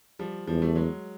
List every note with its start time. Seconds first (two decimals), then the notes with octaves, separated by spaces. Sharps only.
0.19 F3 G3
0.47 E2 F3 G3
0.62 G3 A3
0.75 F#3 G#3